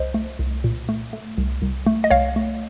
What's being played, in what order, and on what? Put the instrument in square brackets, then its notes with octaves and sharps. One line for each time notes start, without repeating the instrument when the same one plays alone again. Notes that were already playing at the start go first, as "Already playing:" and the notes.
Already playing: [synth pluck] C2 C5 D#5
A3
C2
A#2
A3
A3
C2
C2
A3
D#5
C2 C#5 F5
A3